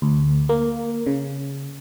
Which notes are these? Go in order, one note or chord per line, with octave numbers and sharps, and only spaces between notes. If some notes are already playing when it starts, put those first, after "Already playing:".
D2
A#3
C#3